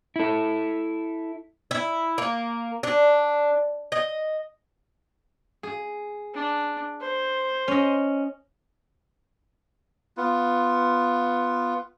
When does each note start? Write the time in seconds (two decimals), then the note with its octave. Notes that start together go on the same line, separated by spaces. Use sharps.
0.16 E4 A4
1.71 E4
2.18 A#3
2.83 D4
3.92 D#5
5.63 G#4
6.34 D4
7.01 C5
7.68 C#4 D#5
10.17 B3 F4